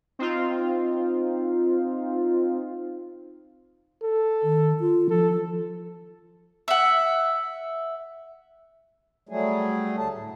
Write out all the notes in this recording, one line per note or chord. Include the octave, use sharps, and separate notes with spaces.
C4 D#4 F4
A4
D#3
F4
F3 A4
E5 F#5
F#3 G3 A3 G#4
D2 D3 A5
A2